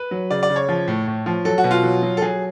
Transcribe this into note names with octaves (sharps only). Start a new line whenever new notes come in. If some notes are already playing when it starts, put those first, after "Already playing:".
Already playing: B4
F#3
C#3 D5
D5
C#3
C#5
F3
A2
A2
F3
F#3 A4
F#4
B2
F4
F#3
F#3
A4
F#3 G#4